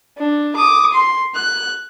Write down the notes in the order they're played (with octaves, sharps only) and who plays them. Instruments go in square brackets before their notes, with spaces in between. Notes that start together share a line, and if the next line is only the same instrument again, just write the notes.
[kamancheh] D4
D6 D#6
C6
F#6